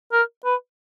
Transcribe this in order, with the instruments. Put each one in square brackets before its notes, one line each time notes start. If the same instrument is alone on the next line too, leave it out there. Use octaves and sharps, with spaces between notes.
[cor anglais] A#4
B4